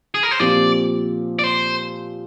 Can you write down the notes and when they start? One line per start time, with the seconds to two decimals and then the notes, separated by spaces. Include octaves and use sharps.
0.14 G#4
0.23 A#4
0.31 C5
0.40 A#2 F3 C4 G4 D5
1.39 D5
1.44 C5